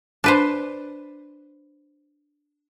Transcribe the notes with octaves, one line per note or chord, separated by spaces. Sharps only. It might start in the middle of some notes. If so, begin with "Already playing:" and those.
D4 B4 C5